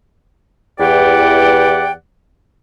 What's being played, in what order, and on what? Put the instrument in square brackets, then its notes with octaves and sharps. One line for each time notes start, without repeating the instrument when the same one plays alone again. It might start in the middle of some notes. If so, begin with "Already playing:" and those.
[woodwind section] E2 E3 G4 D5 F#5 G5